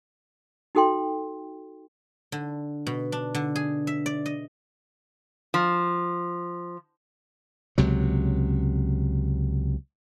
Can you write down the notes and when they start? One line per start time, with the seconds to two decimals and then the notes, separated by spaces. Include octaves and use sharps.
0.75 D#4 F#4 A4 G5 C6
2.32 D3
2.87 B2
3.12 D4
3.35 D3
3.56 G#4
3.87 E5
4.06 D5
4.26 D#5
5.54 F3
7.78 C#2 C3 F#3